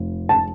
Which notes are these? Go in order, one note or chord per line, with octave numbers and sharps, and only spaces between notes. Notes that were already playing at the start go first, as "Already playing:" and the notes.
Already playing: F1
A5